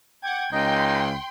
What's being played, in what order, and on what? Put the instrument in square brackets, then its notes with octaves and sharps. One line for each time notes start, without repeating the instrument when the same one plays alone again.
[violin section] F#5 D6 G#6 [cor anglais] G5
[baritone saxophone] C#2 [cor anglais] D#4 [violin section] G5 C6